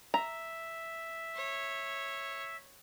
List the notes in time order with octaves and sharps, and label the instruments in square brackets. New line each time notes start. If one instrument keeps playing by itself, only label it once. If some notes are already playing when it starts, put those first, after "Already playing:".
[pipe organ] E5 [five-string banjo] A#5
[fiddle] C#5